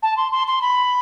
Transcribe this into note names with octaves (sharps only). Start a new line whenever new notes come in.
A5
C6
C6
C6
B5